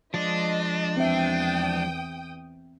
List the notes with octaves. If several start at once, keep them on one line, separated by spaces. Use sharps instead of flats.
F3 G#3 D4 D5 D#5
E2 C4 E5 G5 D#6